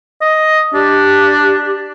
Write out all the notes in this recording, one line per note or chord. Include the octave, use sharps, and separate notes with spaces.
D#5
D4 G4